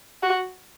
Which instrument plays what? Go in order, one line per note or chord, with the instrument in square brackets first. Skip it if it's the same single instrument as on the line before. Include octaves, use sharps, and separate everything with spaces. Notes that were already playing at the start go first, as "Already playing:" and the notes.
[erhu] F#4